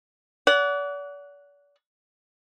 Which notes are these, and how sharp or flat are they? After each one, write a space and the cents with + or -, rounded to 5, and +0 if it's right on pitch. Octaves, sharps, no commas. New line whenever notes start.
D5 -40 F#5 +0